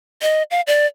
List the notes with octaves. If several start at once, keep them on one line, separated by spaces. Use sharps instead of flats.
D#5
F5
D5